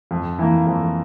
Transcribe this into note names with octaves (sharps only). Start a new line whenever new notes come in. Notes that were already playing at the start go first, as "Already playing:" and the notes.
F2
E3 A#3
F2